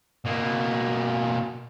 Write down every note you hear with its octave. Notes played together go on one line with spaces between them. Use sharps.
B2 A#3